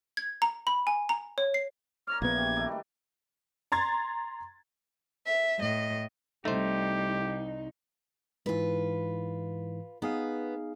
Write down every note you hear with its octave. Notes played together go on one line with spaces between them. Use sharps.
G#6
A#5
B5
G#5
A#5
C#5
C7
A#4 C#5 D5 F6
A#1 C#3 E3 A#3 B3 G#6
C#4 D4 G4
D#3 A3 D4
G3 A3
A#5 C6 G#6 A6
E5
A2 D#5
C2 A3 D#4 G4 C5
G#2 E3 F4 B4
B3 D#4 G#4 F5